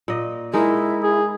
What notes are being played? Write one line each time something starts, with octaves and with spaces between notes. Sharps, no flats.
A#2 D#5
G#3 D#4 E4 A#4
G#4